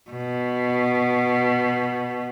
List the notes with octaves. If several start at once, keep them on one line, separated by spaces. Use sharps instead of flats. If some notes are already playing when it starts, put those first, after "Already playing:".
B2